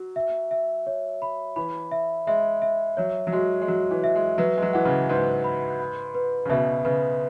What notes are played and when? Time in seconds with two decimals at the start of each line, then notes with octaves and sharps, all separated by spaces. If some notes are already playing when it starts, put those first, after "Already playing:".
Already playing: F#3 F#4
0.16 E5
0.51 E5
0.87 C#5
1.22 B5
1.56 E3 B5
1.91 E5
2.27 G#3 E5
2.62 E5
2.97 F#3 C#5
3.27 F#3
3.32 G#3 F#4
3.62 G#3
3.68 F#3 F#4
3.91 E3
4.04 E5
4.15 G#3
4.38 F#3 B4
4.57 G#3
4.62 F#3
4.73 E3 F#5
4.85 C#3
5.09 G#2 B4
5.44 B5
5.79 B5
6.15 B4
6.45 C#3
6.50 B2 E5
6.85 C#3 B4